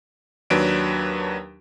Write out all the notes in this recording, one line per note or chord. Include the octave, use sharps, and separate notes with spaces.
D#2 F#3 D4 B4 D7